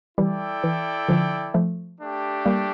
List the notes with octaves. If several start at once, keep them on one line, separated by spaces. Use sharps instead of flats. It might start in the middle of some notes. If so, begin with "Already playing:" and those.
E3 G3 E4 A4 D5 G5
E3
D3 F3
F3 A3
A3 D4 G4
G3 A#3